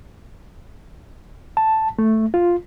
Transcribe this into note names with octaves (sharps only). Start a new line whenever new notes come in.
A5
A3
F4